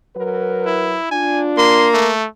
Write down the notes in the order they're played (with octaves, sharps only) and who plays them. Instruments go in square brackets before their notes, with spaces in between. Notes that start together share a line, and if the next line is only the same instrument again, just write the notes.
[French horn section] F#3 A#4 B4
[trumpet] E4
[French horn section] D4 F4 [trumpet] G#5
[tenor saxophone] A#3 [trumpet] C6
[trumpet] A3